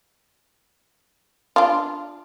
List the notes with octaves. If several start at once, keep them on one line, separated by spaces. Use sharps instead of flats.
D4 F4